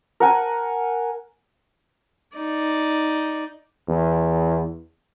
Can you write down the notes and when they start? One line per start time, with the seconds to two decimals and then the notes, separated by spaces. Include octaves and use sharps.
0.20 A#4 F#5 G#5
2.37 D#4 D5
3.88 E2